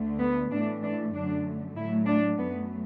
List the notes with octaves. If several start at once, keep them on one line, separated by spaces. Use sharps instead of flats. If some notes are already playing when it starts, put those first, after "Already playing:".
Already playing: D2 D3 A3
B3
A2 E3 A3 D4
D4
F#2 D3 F#3 A3 D4
A2 F#3 A3 E4
D4
F#2 F#3 A3 B3